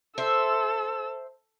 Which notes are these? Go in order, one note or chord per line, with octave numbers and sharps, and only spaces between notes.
A4 C5 E5 E6